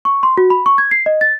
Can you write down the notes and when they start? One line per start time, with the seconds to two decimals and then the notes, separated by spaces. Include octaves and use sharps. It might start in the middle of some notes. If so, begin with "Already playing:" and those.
0.05 C#6
0.23 C6
0.37 F#4
0.50 B5
0.66 C#6
0.78 G#6
0.91 C7
1.06 D#5
1.21 A6